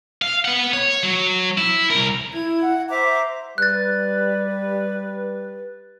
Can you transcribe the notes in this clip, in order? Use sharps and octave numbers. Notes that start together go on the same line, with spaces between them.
F5
B3 F#5
C#5
F#3
E4
C2 A#4
E4 G#6
F#5
C5 E5 A#5 D6
G3 B4 F#6 A6